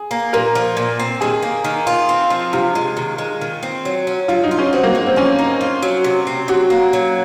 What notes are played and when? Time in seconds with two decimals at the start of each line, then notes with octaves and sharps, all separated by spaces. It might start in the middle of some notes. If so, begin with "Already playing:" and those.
Already playing: G#4
0.11 A#3
0.33 A#2 A#4
0.55 F3
0.77 A#2
0.99 C4
1.21 D#3 G#4
1.43 A#3
1.64 D#3
1.87 F4
2.09 C4
2.30 F3
2.53 C3 F4
2.75 G#3
2.97 D#3
3.18 G#3
3.41 D#3
3.63 C4
3.85 F#3
4.07 C#4
4.28 F#3 F4
4.44 D#4
4.51 F4
4.59 C#4
4.73 C4 F#4
4.83 A#3
4.95 G#3
5.06 C4
5.16 F3 C#4
5.39 D#4
5.61 F4
5.82 F#3
6.04 C3
6.27 C4
6.48 F#3 F#4
6.70 A#3
6.93 F#3